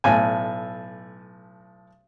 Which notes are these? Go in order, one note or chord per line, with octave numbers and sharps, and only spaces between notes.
B1 A2 G#5